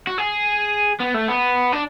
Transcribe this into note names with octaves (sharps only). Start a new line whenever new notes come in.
F#4
G#4
B3
A3
B3
D4